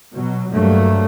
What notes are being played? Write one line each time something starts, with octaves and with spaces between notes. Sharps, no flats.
B2 F#3
G2 F#3 A3 A#3